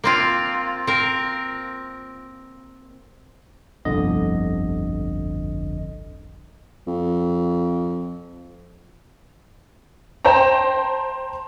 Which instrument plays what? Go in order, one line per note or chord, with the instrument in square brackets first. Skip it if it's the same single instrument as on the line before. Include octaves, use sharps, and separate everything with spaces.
[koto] A#3 C4 F4
C4 A#4
[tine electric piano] G1 C2 F2 D3 D#5
[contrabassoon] F2
[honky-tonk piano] C5 G5 A5 A#5